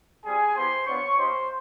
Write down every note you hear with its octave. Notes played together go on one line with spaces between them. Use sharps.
G3 C4 F4 G#4 G#5
B3 E4 G4 C5 C6
B3 D4 F4 C#5 C#6
A#3 D#4 G4 C5 C6